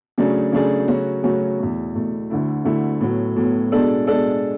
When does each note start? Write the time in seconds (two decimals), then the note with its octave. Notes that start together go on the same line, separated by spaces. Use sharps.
0.18 C#3 F#3 A3 D4 G#4
0.52 C#3 F#3 A3 D4 G#4
0.88 C#3 F#3 A3 C#4 F#4
1.23 C#3 F#3 A3 C#4 F#4
1.59 E2 B2 A3
1.95 E2 B2 A3
2.30 D2 D3 A3 E4
2.65 D2 D3 A3 E4
3.00 A2 F#3 B3
3.36 A2 F#3 B3
3.72 B2 G#3 D4 A4
4.07 B2 G#3 D4 A4